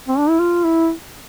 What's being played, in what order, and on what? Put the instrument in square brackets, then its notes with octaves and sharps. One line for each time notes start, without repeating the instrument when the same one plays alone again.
[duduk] C4
D4
E4
F4
E4